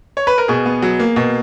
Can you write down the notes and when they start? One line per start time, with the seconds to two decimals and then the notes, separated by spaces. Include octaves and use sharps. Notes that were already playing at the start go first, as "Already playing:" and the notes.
0.17 C#5
0.27 B4
0.38 A#4
0.48 B2 G#4
0.66 B3
0.82 F#3
1.00 A#3
1.16 B2